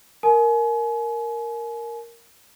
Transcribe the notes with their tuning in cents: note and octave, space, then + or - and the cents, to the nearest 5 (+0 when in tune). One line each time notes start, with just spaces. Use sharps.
A#4 +0 G#5 +35